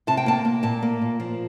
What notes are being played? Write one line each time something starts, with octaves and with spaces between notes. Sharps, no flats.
C3 A5
G5
A#3 A5
A#3
A#2 A5
A#3
A#2
F3